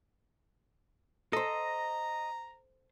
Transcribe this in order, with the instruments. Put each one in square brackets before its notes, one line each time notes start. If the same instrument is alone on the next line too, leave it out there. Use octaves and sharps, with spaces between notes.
[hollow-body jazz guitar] A4 C5 [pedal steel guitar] D#5 [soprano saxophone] A#5